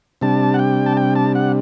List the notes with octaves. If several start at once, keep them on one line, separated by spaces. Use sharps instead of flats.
C3 G3 D4 A5
F#5
G5
A5
G5
A5
F#5